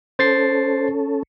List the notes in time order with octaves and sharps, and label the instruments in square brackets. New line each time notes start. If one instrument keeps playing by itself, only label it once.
[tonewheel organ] C#4 A4 [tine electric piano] C5 A6 C7